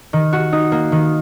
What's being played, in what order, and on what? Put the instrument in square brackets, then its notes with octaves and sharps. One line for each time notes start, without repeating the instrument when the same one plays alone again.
[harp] D#3
F#4
D#4
A#3
D#3